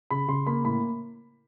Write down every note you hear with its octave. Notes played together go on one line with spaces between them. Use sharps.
C#3 B5
C#3 C6
A#3 B5
A2 B5